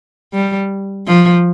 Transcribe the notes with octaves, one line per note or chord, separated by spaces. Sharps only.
G3
F3